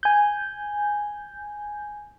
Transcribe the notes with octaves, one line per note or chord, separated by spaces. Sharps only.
G#5 G6